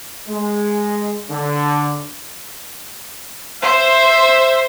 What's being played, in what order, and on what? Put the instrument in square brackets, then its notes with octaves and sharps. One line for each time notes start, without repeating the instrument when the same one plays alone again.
[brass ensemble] G#3
D3
[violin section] C5 [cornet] E5